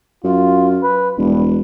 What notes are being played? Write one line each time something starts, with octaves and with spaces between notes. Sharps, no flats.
F#2 F4
B4
E1 G2